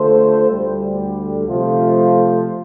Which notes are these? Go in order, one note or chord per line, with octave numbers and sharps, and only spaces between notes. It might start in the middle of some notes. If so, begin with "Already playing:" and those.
Already playing: D3 A3 F4 A4 C5
D2 D3 G3
C3 F3 A3 F4 C5